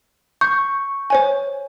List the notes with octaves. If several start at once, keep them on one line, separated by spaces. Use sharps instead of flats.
C#6 G6
C5 C#5 G#5